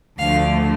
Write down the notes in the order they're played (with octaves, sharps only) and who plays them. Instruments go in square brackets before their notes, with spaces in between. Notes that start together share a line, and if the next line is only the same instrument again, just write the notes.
[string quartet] D2 D3 F3 A3 F5